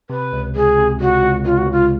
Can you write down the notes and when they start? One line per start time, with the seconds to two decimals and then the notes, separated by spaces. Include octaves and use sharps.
0.10 C3 B4
0.33 C#2
0.55 C#2 G#4
0.78 C3
1.00 C#2 F#4
1.23 C#2
1.45 C#2 F4
1.58 F#4
1.67 C#2 F4